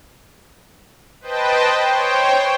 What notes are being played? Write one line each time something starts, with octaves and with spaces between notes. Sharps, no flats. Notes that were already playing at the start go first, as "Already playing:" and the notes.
B4 C5 D#5 G5 A5
C5 C#5 G5